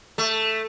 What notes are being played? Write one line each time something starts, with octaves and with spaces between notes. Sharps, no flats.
A3